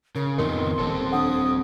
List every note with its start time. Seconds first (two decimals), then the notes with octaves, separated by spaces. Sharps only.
0.15 C#3 A#4
0.38 F2 A2 C3 D#3 B3 D#4 A#4 C6
0.79 D#1 C4 A4
1.12 D4 F#5 D#6